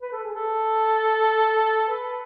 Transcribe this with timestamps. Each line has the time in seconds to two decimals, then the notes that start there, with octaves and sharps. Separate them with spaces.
0.02 B4
0.13 A4
0.24 G#4
0.34 A4
1.88 B4